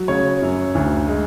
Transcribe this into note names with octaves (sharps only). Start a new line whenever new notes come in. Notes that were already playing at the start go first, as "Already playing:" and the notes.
Already playing: F#3
C#3 C#5
F#2
D2
G#3